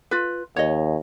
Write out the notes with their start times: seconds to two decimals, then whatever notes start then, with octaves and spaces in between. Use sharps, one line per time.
0.11 F4 B4
0.56 D#2 C#5 D#5